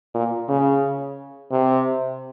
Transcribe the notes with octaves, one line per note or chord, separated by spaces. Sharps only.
A#2
C#3
C3